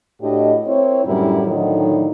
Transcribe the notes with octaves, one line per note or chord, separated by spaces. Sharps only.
A2 D4 F#4 G4 D#5
C4 E4 A#4 C#5
F#2 A2 D3 G3 E4 A#4
A2 D3 D#3 F3 F#3 D#4